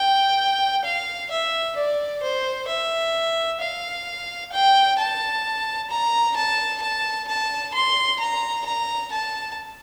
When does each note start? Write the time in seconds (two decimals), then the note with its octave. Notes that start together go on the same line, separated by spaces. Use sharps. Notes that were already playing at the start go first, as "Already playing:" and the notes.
Already playing: G5
0.85 F5
1.30 E5
1.76 D5
2.22 C5
2.68 E5
3.60 F5
4.52 G5
4.98 A5
5.90 A#5
6.36 A5
6.82 A5
7.28 A5
7.74 C6
8.20 A#5
8.65 A#5
9.12 A5